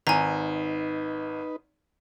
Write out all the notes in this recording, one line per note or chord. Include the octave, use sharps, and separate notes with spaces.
G#1 D#4 B4 G#5 A#5